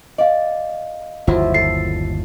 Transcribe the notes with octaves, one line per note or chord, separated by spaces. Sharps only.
D5 D#5 F5
G1 D#2 F3 F#3 E4
A4 C7